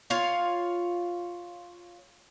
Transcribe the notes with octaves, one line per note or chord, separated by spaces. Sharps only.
F4 C#5 F5